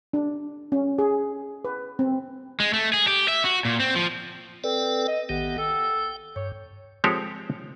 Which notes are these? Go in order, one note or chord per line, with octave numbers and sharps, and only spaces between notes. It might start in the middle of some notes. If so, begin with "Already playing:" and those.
D4
C#4
G#4
B4
C4
G#3
A3
G#4
G4
E5
F#4
A#2
C4
F3
C4 A4 B4 D5
D#5
A1 D#3 B3 G4
A4 G5
G2 C#5
F3 G#3 C4 G4 A4 C#5